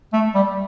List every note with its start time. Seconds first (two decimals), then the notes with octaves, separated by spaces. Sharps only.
0.13 A3
0.35 G3